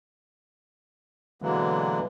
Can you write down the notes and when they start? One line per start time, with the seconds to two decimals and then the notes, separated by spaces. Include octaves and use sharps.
1.42 B2 D3 E3 F#3 G#3 A#3